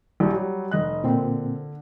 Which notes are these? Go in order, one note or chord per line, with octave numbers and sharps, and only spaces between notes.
A#1 G3 F#4
F#3 G3
F1 D#5 F#6
A#2 D3 C4